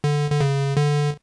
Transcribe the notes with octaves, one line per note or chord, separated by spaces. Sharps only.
D3
D3
C#3
D3